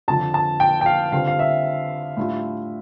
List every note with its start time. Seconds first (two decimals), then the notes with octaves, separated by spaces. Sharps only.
0.08 F2 D3 F3 A5
0.34 A5
0.60 G5
0.81 G5
0.86 F5
1.12 D3 G3 C4 F4 F5
1.28 F5
1.39 E5
2.17 A2 G3 D4 F4